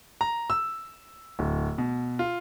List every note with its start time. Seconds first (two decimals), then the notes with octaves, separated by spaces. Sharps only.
0.21 A#5
0.50 E6
1.39 D1
1.78 B2
2.19 F4